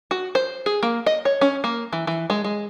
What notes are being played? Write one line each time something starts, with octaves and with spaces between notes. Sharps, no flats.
F#4
C5
G#4
A#3
D#5
C#5
C#4
A#3
E3
E3
G#3
G#3